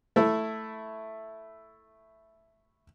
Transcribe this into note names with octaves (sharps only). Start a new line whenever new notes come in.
A3 E4